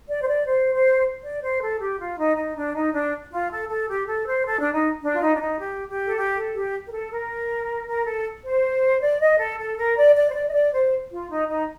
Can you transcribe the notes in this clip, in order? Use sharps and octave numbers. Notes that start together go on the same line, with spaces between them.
D5
C5
D5
C5
C5
D5
C5
A4
G4
F4
D#4
D#4
D4
D#4
D4
F4
A4
A4
G4
A4
C5
A4
D4
D#4
D4
F4
D#4
D4
D#4
G4
G4
A4
G4
A4
G4
A#4
A4
A#4
A#4
A4
C5
D5
D#5
A4
A4
A#4
D5
D5
C5
D5
D#5
D5
C5
F4
D#4
D#4